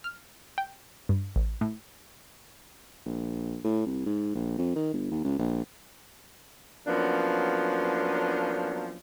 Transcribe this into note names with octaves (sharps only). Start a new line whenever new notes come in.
F6
G5
G2
A1
A2
A#1
A2
C2
G#2
A#1
F2
D#3
G1
D#2
C#2
A#1
F3 F#3 A#3 B3 C#4 D4